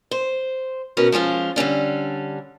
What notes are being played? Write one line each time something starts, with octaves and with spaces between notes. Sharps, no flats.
C5
B2 C#4 F#4 A#4 B4
F3 G#3 C#4 F4
D3 G3 C#4 D4